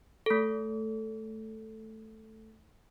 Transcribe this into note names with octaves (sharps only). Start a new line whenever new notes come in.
A3 A4